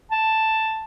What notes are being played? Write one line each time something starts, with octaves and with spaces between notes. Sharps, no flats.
A5